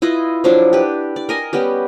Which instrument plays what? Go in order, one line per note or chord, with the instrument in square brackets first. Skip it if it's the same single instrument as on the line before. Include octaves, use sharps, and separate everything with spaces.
[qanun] E4 F4 B4 D#5
F3 F#3 D4 E4
G4 B4
D5
A#4 D#5 G#5
G3 B3 C#4 G4